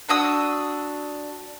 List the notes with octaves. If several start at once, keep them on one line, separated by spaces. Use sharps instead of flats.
D4 F#4 D#6 E6